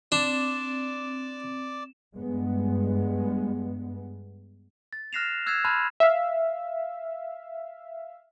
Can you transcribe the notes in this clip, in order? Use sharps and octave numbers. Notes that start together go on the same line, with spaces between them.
C4 D4 D5 D6 E7
G2 G#3 B3
A6
F6 F#6 A#6 C7 E7 F7
E6 F#6 G#6 A6 C7 E7
A5 B5 C6 F6 F#6 G#6
E5 F5